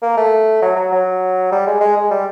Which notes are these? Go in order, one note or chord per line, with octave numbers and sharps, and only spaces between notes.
A#3
A3
F#3
F#3
F#3
G3
G#3
G#3
G#3
G3